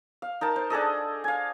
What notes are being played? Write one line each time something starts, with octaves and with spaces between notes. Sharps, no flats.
F5
D#4 A#4 A5
C5
D4 G#4 A4 D#5
F5 G#5